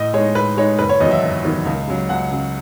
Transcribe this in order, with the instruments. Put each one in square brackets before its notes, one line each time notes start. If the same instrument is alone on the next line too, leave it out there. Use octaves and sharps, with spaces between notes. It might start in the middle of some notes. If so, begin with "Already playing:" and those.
Already playing: [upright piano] A2 D#5
G#3 D#4 C#5
A2 B4
G#3 D#4 C#5
F#1 B4
C#5
E2 D#3 F#3 D#5
E5
F#1
E2 D#3 F#3
C#2
C#3 F#3
C#2 F#5
C#3 F#3